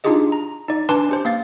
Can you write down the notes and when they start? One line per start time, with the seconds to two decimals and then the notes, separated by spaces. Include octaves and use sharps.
0.04 D4 D#4 F4 G4 G#4 D#5
0.32 A#5
0.68 D#4 D5
0.89 D4 B4 G#5 A5 C6 D6
1.09 C#4 G4 C5
1.25 A#3 F5 A6